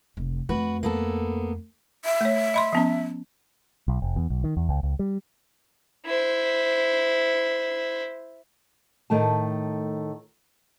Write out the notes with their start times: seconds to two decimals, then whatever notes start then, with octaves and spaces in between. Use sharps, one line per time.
0.17 F1
0.49 F2 A3 F#4 B4
0.83 A#3 B3 A4
2.05 E5
2.21 A3 C#5
2.54 D#5 B5 C6
2.73 F3 B3 C#4
3.88 B1
4.02 F1
4.16 E2
4.30 B1
4.44 D#3
4.57 E2
4.69 C#2
4.83 C#2
4.99 G3
6.06 E4 C5
9.10 A2 D#3 A3 A5